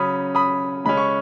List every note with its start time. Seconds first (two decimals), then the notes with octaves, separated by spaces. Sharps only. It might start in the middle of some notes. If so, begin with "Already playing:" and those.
Already playing: C#3 F#3 C#4 B5 D#6
0.35 B5 D#6
0.85 C#3 G#3 C#4 B5
0.97 C#6